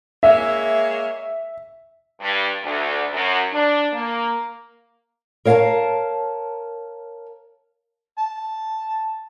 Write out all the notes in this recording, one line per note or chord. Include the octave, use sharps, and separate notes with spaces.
G#3 A#3 C#5 E5
G2
D2
F#2
D4
A#3
A#4 C#5 F5 F#5 A5 A#5
A5